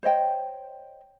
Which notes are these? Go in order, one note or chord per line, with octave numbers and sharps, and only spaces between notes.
C5 C#5 D#5 G5